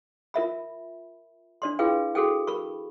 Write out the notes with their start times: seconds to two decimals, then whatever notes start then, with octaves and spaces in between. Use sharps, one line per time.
0.34 F4 A#4 E5 B5
1.62 D4 D5 C6
1.79 E4 F4 G#4 B4 F5 G5
2.15 F#4 G#4 A4 G5
2.47 A#4 B5 C#6